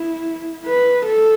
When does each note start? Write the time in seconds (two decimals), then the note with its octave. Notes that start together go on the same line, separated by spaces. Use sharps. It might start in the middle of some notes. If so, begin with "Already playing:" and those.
Already playing: E4
0.66 B4
1.06 A4